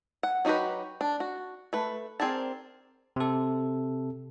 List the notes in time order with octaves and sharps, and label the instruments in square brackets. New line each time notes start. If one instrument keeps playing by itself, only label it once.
[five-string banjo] F#5
F#3 D#4 F#4 G4 B4
D4
F#4
A3 B4
C4 G#4 A#4 D5 A5
[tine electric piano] C3 A4